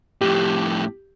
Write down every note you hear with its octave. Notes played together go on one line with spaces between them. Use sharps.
F2 A2 G4